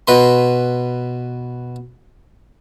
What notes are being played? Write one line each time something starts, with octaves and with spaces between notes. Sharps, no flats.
B2 B4 C6